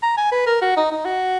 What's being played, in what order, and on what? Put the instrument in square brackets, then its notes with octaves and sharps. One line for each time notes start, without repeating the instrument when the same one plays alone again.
[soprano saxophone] A#5
G#5
B4
A#4
F#4
D#4
D#4
F#4